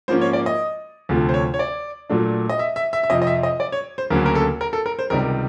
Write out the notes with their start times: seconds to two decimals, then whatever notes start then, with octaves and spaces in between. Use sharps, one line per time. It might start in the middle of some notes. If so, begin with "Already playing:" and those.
0.08 G#2 F3 A#3 C#4 C5
0.21 C#5
0.33 D5
0.46 D#5
1.09 D2 C3 F3 A3
1.29 C5
1.34 C#5
1.54 C#5
1.59 D5
2.10 A#2 F#3 A3 D4
2.49 D#5
2.59 E5
2.76 E5
2.93 E5
3.03 E5
3.10 F2 C3 F3 D#5
3.22 D#5
3.27 E5
3.43 D#5
3.60 D5
3.72 C#5
3.98 C5
4.10 D2 C#3 F#3 A#3 C#4 A#4
4.26 A#4
4.35 A4
4.61 A#4
4.73 A4
4.86 A#4
4.99 C5
5.10 C#2 C3 D#3 G3 A#4